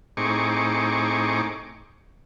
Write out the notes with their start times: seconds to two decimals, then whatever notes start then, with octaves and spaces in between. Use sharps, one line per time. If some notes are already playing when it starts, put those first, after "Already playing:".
0.17 A2 C4 D#4 G#4 C#6 D6